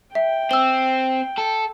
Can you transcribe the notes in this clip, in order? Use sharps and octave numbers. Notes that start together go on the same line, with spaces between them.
E5 G5
C4 E6 G7
A4